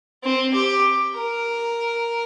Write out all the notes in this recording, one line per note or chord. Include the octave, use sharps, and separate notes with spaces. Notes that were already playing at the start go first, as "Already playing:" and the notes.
C4
G4
A#4